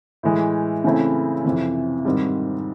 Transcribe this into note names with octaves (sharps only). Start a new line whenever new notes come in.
A2 E3 G#3
C#3 E3 A3 C4 E4
F2 C3 E3
G#2 D#3 G3 C4